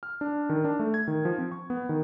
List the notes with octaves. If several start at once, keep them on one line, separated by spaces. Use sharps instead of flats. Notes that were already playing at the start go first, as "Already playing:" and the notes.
F6
D4
D#3
D4
A3
G#6
D#3
F3
C4
C#6
B3
D#3